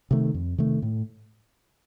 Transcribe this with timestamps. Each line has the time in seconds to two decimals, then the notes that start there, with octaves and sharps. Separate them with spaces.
0.11 C3 D#3 A3
0.34 F2
0.58 C3 D#3 A3
0.82 A2